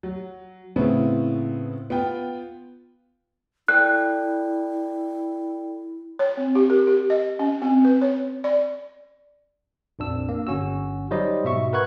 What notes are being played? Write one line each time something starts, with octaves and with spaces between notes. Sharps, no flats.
F#3
A2 C#3 B3 C4 E4
B3 F4 G5
E4 A4 D5 G5 F#6
C#5
C4
G4
A#4
G4
D#5
C#4
C4
B4
C#5
D5
A#1 F2 D4 E6
A#3
G1 C#4 F#4 E6
F#3 G3 D#4 C5 D#5
G#2 B2 E5 C#6
A#4 B4 F#5 C#6 F#6 G#6